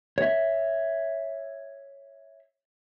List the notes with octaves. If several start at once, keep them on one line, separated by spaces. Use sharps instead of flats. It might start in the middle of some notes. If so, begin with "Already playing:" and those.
C#5 E5